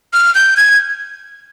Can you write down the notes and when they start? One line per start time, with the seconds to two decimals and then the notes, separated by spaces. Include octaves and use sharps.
0.14 F6
0.35 G6
0.57 G#6